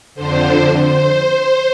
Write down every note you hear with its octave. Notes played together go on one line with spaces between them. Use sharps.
F2 D3 C5
C5